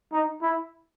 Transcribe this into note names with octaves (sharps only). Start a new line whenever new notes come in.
D#4
E4